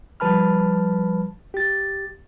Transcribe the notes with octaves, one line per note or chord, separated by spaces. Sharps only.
F3 G3 B4 A5 B5 F6
G4 A6